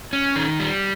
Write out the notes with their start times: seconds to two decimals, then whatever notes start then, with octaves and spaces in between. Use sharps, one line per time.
0.13 C#4
0.36 D#3
0.60 G3